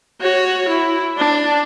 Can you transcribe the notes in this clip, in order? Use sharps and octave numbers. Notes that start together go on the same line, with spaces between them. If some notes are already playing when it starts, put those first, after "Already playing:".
F#4 C#5
E4
D4